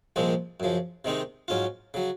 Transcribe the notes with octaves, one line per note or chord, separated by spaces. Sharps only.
C2 A#2 F3 G#3 C4
F#2 C#3 F3
C3 D#3 G#3 C4 D#4
G#2 F#3 C#4 F4
C#3 F#3